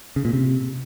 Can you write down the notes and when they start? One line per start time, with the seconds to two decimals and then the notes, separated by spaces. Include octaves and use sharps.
0.16 C#3
0.25 A#2
0.33 C3